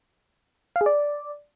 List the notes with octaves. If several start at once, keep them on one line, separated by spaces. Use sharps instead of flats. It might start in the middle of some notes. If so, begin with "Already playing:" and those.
F5
G#4
D5